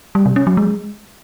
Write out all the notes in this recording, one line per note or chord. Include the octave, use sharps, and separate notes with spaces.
G3
C3
C#4
F#3
G#3